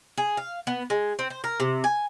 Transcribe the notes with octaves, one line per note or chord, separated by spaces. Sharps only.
G#4
F5
B3
G#3
C4
C5
A#4
C3
G#5